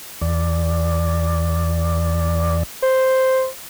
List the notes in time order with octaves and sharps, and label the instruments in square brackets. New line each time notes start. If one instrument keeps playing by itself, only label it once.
[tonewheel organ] E2 D5
[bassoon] C5